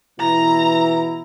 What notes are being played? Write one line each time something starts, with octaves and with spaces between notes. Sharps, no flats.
B2 E3 E4 A#5